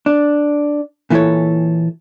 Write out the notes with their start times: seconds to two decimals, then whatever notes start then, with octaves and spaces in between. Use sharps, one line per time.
0.06 D4
1.10 A#2 E3 E4 F#4 A4 C#5